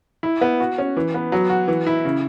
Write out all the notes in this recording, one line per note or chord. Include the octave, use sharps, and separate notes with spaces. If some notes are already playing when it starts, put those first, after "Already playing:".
E4
B3
F#4
C#4
E3
B3
F#3
F#4
E3
E4
C#3